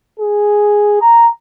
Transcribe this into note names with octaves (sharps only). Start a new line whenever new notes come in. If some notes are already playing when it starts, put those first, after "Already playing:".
G#4
A#5